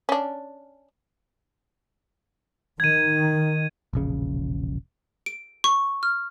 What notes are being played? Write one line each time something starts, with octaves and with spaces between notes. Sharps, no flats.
C#4 D4
D#3 G#6 D#7
E1 A#1 C#3
D7
C#6
F6